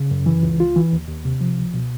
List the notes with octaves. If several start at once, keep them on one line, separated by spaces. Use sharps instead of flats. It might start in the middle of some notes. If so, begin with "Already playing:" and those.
Already playing: C#3
F#2
E3
C#2
F4
E3
D#2
D#2
C3
F3
C#2
B2